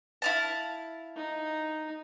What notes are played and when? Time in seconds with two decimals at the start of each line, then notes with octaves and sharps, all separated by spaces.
0.22 E4 F5 A5
1.15 D#4